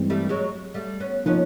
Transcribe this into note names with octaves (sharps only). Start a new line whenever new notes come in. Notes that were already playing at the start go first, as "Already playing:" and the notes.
Already playing: G2 E3 G#3 C4
G3 A3
F#3 G#3
G3 A3
B3 C#4
F3 A#3 B3 C#4 D#4